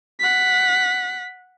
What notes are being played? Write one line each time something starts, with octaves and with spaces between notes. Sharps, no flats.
F#5 B6